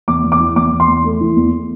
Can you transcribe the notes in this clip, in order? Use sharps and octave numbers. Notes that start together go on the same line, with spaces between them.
E2 D6
E2
D6
E3
E2 D6
E2
C6
E2
A3
E3
E2